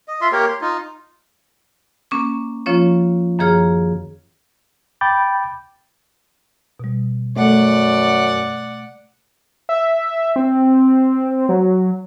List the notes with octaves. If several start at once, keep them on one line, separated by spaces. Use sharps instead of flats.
D#5
F4 E5 C6
A#3 G4 A#4 C#5
C6
D#4 F4
A#3 C#4 D6
F3 A#3 C#4 F4 C#5
F#2 D#3 F3 G#4 C#5 F6
G5 B5 D6 G6 A6
B2 G3
F#2 A3 A4 D5 F#5
E5
C4
F#3